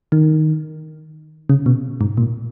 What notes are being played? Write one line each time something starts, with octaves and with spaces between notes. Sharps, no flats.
D#3
C#3
B2
G#2
A#2